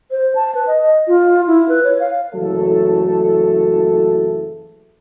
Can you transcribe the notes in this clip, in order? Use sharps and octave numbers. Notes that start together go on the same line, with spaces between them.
C5
A5
B4
D#5
D#5
F4
E4
B4
C#5
F5
F#1 E3 F#3 A3 A4